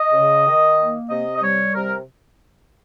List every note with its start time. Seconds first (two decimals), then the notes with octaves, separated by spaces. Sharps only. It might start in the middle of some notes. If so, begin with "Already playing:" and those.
Already playing: D#5
0.13 C#3
0.45 D#3
0.78 A#3
1.10 C3 D#5
1.37 D#5
1.42 G3 C#5
1.74 C3 A#4